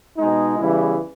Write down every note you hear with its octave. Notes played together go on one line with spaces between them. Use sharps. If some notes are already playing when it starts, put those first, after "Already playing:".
G#3 D#4
B2
E2 C#3 E3 G3 E4